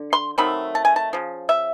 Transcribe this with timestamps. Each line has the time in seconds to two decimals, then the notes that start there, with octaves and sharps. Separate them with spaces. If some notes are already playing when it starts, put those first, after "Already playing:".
Already playing: D3
0.13 C6
0.38 D#3 F#3 A3 C4 B5
0.75 A5
0.85 G#5
0.96 A5
1.13 C#3 F3
1.49 E5